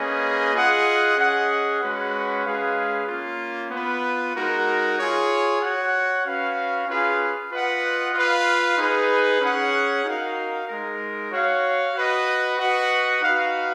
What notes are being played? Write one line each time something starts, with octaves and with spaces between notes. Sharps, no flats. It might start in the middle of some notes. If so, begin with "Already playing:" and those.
Already playing: A#3 C#4 G#4 B4 D#5
F4 G#4 D#5 F#5
C#4 G#4 D#5 F#5
G#3 C#4 F#4 B4 F#5
G#3 C#4 G#4 B4 F5
A#3 C#4 F4
B3 F4 B4
G#3 D#4 F#4 A#4
F4 G#4 C#5
F#4 C#5 F#5
C#4 F#4 B4 F5
C#4 F4 G#4 B4 F5
F4 B4 D#5 F#5
F4 B4 F5
D#4 G#4 B4
C#4 G#4 C#5 F#5
D#4 F#4 A#4 F5
G#3 D#4 A#4
F#4 C#5 F5
F#4 B4 D#5
F#4 B4 D#5 F#5
D#4 F#4 B4 F5